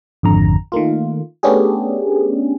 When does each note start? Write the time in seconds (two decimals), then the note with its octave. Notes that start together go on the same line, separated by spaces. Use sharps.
0.23 G#1 F2 D3 A#5
0.72 D#3 A3 A#3 F4
1.43 A3 B3 C#4 D4 G4 G#4